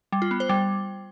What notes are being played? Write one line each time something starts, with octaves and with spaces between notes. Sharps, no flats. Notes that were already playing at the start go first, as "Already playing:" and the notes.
G3
F4
B3
C5
G3